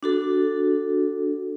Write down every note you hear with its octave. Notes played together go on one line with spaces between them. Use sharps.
D4 F#4 A4